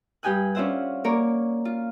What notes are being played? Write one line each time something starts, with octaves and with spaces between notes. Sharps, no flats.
G2 G4 G5 G#5 D#6 F#6
C#4 D4 F4 C5 E5 F#5
A#3 A#4 C#5 D5
F4